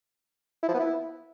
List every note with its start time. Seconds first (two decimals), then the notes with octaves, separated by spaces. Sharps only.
0.63 E4
0.68 F3
0.74 B3
0.80 E4